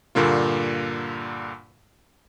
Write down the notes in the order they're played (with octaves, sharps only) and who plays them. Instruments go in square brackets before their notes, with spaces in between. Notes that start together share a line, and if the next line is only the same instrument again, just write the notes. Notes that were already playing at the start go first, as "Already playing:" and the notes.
[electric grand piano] G2 A#2 D3 A#3 F4